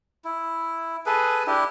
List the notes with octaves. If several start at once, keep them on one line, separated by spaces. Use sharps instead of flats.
E4
G#4 A4 B4
D4 E4 G4